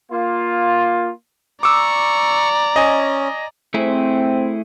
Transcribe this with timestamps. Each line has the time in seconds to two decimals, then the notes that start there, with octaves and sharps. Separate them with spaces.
0.12 A#3 F4
1.63 D5 A#5 C#6 D6 E6
2.76 C#4 D#5 G#5
3.74 A3 C4 E4 G#4